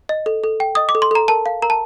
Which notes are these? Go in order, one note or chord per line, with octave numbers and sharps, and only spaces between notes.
D#5
A4
A4
G5
D#5 D#6
D6
A4
C6
A4 A#5
A#4 A5
F5
A#4 A#5
A5